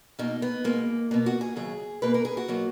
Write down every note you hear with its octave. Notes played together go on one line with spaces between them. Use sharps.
B2 A#3 D#4
B3
B2 G#3 A#3
B2 A#3 B3
F#4
G#4
D#2 C#3 F#3 G#4
B2 A#3 B4
A#4
G#4
F#4
B2 F#3 A#3